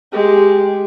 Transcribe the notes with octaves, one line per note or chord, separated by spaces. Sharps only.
G#3 G4